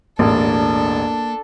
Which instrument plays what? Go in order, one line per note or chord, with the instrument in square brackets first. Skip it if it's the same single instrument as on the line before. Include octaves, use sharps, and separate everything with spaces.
[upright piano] E1 A1 [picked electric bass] A#3 [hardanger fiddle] D4 A4